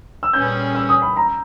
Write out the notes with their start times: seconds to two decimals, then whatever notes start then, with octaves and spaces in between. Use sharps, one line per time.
0.23 E6
0.33 A#2 G3 C#4 G#4 B4 G6
0.75 E6
0.89 D#6
1.02 B5
1.17 A#5